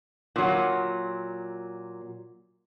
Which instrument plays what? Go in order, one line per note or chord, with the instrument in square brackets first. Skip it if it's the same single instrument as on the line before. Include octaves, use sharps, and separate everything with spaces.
[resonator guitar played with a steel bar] A#2 F#3